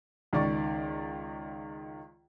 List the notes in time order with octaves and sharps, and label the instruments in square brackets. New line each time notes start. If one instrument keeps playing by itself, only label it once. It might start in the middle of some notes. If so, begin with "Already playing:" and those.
[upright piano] C#2 D#3 D5 C#6